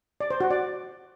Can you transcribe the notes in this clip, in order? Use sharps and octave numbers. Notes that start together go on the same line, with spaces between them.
D5
C5
F#4
D5